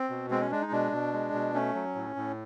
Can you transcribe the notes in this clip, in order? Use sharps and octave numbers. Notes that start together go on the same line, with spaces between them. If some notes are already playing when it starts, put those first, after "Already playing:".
Already playing: C4
B2
G#3 C4
C#4
G#3 D4
D#4
B2 D4
B2
G#3
B2
A3 C#4
F#3
A2
A2